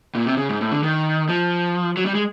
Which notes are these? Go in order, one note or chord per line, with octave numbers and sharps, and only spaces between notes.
A#2
C3
C#3
G#2
A2
D3
D#3
F3
F#3
G3
G#3